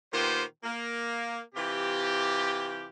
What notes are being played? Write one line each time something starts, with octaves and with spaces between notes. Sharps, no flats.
A#2 D#3 B3 F4 G4 C5
A#3
C3 E3 F4 G4